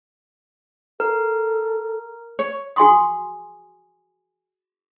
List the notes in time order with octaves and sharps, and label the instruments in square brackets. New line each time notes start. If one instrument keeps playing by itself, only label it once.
[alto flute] A4 [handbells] A#4
[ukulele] C#5
[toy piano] F#4 G#4 G#5 C6 C#6 D#6